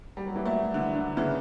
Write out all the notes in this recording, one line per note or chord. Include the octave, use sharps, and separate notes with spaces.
G3
F#3
E3 G3
F#3 A3
D3
D3
C#3 E3